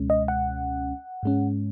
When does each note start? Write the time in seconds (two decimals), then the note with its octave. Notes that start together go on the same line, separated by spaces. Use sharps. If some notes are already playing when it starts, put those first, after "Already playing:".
Already playing: C#2 B2 G#3 C#4
0.10 D#5
0.28 F#5
1.23 G#2 G#3 C#4